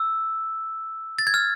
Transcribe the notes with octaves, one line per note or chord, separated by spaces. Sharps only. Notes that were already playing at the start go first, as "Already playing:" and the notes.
Already playing: E6
A6
G#6
F6